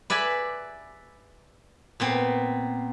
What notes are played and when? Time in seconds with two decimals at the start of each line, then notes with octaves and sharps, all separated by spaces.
0.10 B4 D5 E5 G#5 B5
2.00 A#2 B3 C4